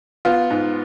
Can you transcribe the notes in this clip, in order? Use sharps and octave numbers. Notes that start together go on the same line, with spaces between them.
B3 F4
G#2